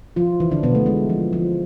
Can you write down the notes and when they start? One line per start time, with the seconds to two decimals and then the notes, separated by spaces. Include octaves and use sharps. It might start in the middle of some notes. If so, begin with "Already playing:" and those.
0.16 F3 F4
0.40 E3 E4
0.51 D3 D4
0.63 B2 B3
0.75 A3
0.86 G#3
1.09 F3
1.33 F3